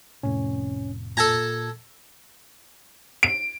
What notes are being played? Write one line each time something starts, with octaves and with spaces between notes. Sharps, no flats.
F1 A2 C3 C#4
A#2 A4 A5 A#5 G#6
D7